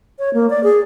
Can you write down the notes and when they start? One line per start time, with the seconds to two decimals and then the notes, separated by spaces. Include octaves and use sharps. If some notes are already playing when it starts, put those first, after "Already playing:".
0.19 C#5
0.34 A#3
0.50 D5
0.64 G#4